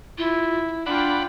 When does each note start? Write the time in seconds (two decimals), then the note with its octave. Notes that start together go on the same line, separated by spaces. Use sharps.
0.18 E4 F4
0.86 D4 F4 D5 F#5 G5 B5